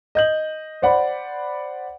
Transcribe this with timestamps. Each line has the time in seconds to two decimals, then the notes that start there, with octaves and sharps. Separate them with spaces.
0.15 D#5 G6 F#7
0.82 C5 D5 F#5 B5